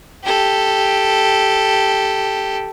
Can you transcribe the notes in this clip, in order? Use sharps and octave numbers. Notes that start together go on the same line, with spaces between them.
G4 A4